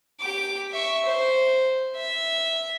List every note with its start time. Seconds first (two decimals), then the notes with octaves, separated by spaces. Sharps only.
0.20 G4 D6
0.72 E5 C#6
1.05 C5
1.96 E5